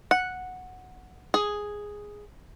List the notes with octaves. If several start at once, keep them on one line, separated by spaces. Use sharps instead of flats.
F#5
G#4